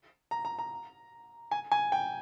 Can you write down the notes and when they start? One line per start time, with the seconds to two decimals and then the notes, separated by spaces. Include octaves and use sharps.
0.31 A#5
0.45 A#5
0.59 A#5
1.51 G#5
1.71 G#5
1.92 G5